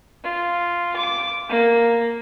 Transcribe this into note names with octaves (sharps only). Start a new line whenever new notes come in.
F4
D6
A#3